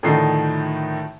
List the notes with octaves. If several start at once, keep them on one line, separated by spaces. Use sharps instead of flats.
A2 D3 D#3 F3 D#4 C7